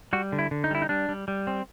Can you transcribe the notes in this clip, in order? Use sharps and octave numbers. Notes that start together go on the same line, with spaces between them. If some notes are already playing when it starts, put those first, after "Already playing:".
G3 F#4
D3
E4
D3
D#4
G3 E4
D#4
G3 D4
G3
G3
C4